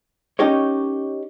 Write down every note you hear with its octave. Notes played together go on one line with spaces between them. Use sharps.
C#4 D#4 G4 A#4 C#5